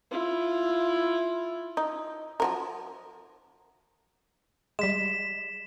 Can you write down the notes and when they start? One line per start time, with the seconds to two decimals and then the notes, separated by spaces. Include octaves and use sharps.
0.11 E4 F4
1.77 D#4
2.40 F3 F#3 A#4
4.79 G3 G#3 B6 E7